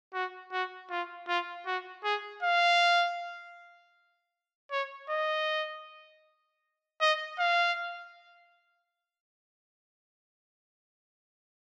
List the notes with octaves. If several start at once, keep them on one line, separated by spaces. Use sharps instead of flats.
F#4
F#4
F4
F4
F#4
G#4
F5
C#5
D#5
D#5
F5